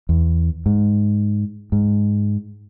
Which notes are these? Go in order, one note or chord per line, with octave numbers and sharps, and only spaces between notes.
E2
G#2
G#2